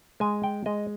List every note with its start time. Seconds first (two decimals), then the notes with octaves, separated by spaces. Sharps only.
0.20 G#3 G#5
0.44 G5
0.66 G#3 D#5